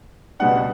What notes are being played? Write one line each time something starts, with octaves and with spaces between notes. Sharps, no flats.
C#2 B2 G3 B3 D4 F#5